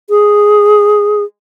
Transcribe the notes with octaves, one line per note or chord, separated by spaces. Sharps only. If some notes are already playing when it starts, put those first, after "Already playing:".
G#4